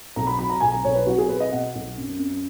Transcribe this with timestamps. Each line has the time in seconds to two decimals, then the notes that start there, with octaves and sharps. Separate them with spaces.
0.16 B1 A#5
0.27 B5
0.38 F#3 B5
0.50 A#5
0.60 B1 G#5
0.72 A#5
0.84 B1 C#5
0.95 B4
1.06 F#3 F#4
1.18 G#4
1.29 B2 B4
1.40 D#5
1.52 B2 F#5
1.75 B1
1.98 F#2
2.19 F#2